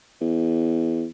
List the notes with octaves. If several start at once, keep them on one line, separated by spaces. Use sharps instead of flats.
E2